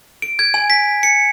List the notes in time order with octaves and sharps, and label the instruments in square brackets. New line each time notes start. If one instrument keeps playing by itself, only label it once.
[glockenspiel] D7
G#6
G#5
B6
C#7